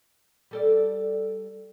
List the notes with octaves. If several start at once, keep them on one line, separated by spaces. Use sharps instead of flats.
G3 A4 D5